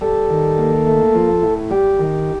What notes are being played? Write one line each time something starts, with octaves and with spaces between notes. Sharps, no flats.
G3 A4
D#3
A#3
A3
F3
A2
G3 G4
D#3